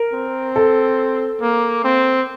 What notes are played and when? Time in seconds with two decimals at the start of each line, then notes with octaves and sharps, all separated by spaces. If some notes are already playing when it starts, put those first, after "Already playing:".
Already playing: A#4
0.14 C4
0.56 A4
1.41 A#3
1.84 C4